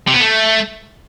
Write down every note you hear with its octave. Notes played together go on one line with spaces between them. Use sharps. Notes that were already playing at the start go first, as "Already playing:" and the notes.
C3
B3
A3